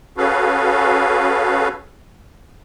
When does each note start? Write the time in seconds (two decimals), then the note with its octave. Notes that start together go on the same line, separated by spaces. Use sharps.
0.17 C#4 F#4 G#4 A4 B4 F5